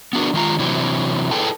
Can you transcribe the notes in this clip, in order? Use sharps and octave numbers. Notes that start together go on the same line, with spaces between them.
B3 D4 F#4 A#4
D#3 G#3 F4 A#5
C3 E3 F#3 C4
E4 G#4 A4 B4 G5 A5